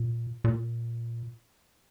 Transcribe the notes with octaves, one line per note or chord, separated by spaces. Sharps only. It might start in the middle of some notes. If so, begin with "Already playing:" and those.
Already playing: A#2
A#2